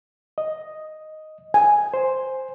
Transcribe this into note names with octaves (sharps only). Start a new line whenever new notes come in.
D#5
G#5
C5